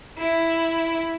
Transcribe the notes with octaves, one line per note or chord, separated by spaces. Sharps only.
E4